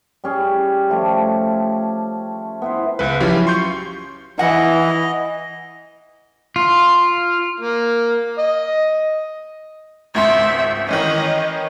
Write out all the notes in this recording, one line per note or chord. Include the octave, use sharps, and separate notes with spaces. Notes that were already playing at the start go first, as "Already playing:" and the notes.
G3 C#4 G#4
F3 A3 G4
B3 E4 C5
C#2 G#3 B4
F3 F#3 C#4 E4 F4 G4
C6 C#6 G6
E3 D#5 F#5
F4
A#3
D#5
G#1 C#2 E5 C6
D#3 E3 C#4 D#5